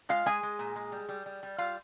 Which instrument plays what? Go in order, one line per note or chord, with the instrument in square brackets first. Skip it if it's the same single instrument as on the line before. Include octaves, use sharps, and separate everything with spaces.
[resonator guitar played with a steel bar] G#3 F4 F5
G#3 G#4 G#5
G#3
A#2
G#3
G3
G3
G3
G3
G3 F4 F5